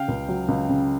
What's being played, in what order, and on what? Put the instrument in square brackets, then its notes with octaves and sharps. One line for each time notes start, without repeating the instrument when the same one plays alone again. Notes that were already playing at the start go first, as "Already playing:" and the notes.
Already playing: [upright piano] C#3 F5 G5
C#2
F#3
C#2
C#3